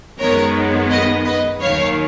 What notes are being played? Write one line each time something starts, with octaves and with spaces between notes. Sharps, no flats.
F#2 D#3 G#3 B3 A#4 C#5
B4 D#5
B4 D#5
D#2 D#3 F#3 C#5 F5